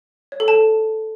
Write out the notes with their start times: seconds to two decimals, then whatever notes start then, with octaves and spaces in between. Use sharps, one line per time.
0.32 C#5
0.40 A4
0.48 A5